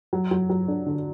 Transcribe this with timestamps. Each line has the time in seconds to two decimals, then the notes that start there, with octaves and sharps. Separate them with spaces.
0.13 F#3
0.31 F#3
0.50 F#3
0.68 D4
0.86 D3